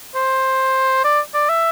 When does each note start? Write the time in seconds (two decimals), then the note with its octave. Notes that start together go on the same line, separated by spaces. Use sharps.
0.15 C5
1.04 D5
1.34 D5
1.49 E5